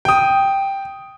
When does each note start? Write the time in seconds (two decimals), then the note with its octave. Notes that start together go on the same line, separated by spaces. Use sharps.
0.05 G5 D#6